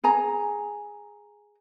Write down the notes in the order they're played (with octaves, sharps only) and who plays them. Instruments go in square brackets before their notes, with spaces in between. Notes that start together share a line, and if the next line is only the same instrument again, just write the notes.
[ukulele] G#4 G#5 A#5